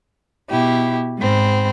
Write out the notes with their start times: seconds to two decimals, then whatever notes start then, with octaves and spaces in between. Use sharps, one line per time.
0.49 B2 E4 G4
1.19 G#2 C4 B5